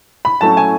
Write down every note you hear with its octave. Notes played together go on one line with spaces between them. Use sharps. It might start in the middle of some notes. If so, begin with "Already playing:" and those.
B5
A2 F#3 A3 C#4 A5
G#5